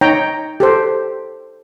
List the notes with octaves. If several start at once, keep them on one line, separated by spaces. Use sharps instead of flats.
D#4 C#5 G5 A#5
G4 A4 C5